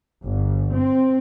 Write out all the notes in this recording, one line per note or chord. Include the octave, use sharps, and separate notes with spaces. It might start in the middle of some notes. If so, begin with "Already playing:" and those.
G1
C4